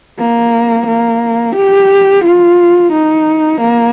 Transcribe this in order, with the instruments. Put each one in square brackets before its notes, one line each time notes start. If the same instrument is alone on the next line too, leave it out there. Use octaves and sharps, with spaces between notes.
[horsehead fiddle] A#3
A#3
G4
F4
D#4
A#3